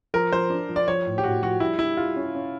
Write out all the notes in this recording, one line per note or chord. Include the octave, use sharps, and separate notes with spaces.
F3 A#4
F3 C5
D4
F3
D5
F3 C#5
A2
G4
A2 F#4
F3 F#4
G3 E4
G3 E4
G3 F4
C#4
C#4